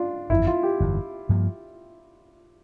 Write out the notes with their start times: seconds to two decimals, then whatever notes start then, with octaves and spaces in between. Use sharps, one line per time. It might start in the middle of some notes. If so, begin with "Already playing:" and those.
Already playing: D4 F4
0.30 G1 F2 E3 E4
0.47 F4
0.63 G4
0.80 G1 F2 E3
1.29 G2 F3 A#3